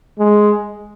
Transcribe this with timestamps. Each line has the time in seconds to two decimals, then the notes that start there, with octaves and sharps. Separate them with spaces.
0.19 G#3